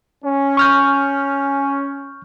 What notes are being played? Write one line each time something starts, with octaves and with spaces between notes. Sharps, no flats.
C#4
C#6 F6 G6